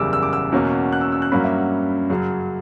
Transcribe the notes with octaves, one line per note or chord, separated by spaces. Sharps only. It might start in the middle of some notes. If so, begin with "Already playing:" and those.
Already playing: F#1 E2 C#3 G3 D6 E6
E6
D6
E6
E2 B2 A#3 C#4
F#6
E6
E6
F#6
G2 F#3 A#3 C#4 B5
E5
F#5
F#2 C#3 F#3